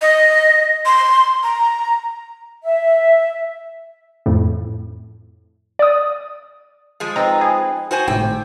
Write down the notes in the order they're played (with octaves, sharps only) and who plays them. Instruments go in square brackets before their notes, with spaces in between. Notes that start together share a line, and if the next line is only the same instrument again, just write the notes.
[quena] D#5
C6
A#5
[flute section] E5
[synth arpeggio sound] F2 A2
D5 D#6
[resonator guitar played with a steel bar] F3 G#3
[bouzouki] C4 D#4 B4 [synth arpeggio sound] A#5
[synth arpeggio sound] G#4
[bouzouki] B3 [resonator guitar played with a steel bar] F#4 C5 G#5
[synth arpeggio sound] G#1 A2 [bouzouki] C3 [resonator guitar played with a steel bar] G5